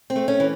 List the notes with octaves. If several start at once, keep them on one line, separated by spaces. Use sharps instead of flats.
C4
A3
C#4
E3